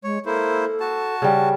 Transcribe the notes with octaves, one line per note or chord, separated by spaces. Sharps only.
G#3 C#5
A#3 E4 A4 C5
F#4 A5
C#3 G3